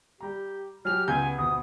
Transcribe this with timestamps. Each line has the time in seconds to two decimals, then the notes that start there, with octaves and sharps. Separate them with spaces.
0.21 G3 G4 A#5
0.85 F#3 G4 G#5 F6 F7
1.08 C#2 B3 G4 G#5 G6
1.38 D2 B2 D#6